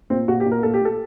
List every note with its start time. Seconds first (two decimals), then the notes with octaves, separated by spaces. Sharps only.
0.10 A#2 C4
0.28 A#2 F#4
0.40 G4
0.46 A#2
0.52 A#4
0.63 A#2 A4
0.74 G4
0.81 A#2 A4